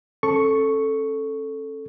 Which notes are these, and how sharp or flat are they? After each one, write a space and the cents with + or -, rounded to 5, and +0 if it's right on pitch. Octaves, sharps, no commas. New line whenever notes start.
C#4 -35 A4 +0 C#6 +0